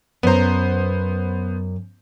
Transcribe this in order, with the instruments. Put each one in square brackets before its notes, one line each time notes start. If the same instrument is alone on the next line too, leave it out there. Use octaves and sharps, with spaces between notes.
[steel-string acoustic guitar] F#2 A#5 [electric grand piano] B3 C5